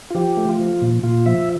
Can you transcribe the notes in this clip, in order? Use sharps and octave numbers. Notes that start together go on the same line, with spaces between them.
F4
F3 G4
A3
F4
F3
A#2
A#2 F4
F3 E5